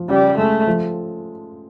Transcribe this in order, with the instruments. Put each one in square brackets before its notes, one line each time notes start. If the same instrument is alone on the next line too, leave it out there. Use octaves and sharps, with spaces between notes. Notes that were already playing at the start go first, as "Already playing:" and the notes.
Already playing: [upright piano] F3
[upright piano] C#3 [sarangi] G3
[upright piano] G#3 [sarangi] A3
[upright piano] F3